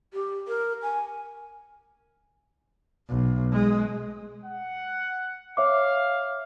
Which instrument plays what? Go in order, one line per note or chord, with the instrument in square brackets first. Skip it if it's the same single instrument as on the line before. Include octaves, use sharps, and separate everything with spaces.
[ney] G4
A#4
G#5
[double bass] B1
G#3
[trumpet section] F#5
[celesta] C#5 E5 D6 [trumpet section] F5